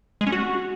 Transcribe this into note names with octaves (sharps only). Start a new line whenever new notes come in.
G#3
C#4
F#4